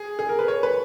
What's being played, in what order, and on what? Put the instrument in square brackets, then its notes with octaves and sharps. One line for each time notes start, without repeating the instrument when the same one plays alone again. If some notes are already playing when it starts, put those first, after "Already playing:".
Already playing: [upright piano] G#4
G#4
A#4
B4
C#5
B4